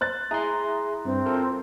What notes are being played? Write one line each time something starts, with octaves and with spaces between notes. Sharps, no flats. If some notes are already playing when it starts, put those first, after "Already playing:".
C5 F#6 A6
E4 G#4 A#5 C6
G2 C4
F4 A4 A#4